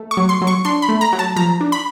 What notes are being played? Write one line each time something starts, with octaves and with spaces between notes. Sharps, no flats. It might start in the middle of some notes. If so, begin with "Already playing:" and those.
Already playing: A3
C#6
F#3
C6
F#3
C#6
D4 C6
B5
A3
A#5
F#3
A5
F3 A#5
D4
B5